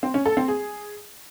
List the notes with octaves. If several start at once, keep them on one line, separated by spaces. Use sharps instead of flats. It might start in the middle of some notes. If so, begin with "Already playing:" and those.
C4
C#4
A4
C4
G#4